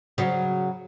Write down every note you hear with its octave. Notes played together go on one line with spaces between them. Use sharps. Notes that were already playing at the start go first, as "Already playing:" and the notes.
C#3 F#3